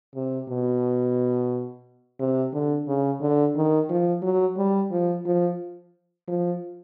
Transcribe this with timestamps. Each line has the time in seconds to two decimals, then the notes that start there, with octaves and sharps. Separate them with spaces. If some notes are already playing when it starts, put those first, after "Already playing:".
0.15 C3
0.49 B2
2.20 C3
2.53 D3
2.88 C#3
3.21 D3
3.56 D#3
3.89 F3
4.23 F#3
4.58 G3
4.91 F3
5.26 F3
6.28 F3